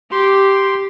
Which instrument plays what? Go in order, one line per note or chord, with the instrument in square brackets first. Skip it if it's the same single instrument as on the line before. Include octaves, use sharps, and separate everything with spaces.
[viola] G4 [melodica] C6